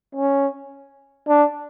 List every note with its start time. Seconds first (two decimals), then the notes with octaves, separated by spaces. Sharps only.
0.15 C#4
1.28 D4